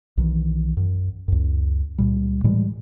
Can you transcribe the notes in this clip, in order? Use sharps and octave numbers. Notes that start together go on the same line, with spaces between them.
B1 D#3 E3
F#2
C#2 F#2
C#2 A#2 G3
A2 E3 G3 G#3